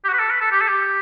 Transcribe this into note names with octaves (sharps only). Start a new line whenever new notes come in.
G4
F#4
B4
A4
B4
A4
G4
A4
G4